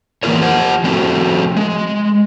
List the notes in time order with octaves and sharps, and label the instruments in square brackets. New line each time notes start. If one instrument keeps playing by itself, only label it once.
[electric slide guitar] E3 A#3 B3 F4 A#4 C#5
G4 C5 F#5
F3 A3 C4 F#4
G#3